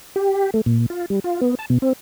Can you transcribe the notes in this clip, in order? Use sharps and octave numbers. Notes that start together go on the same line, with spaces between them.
G4
A3
A#2
F4
G3
F4
B3
A5
B2
C4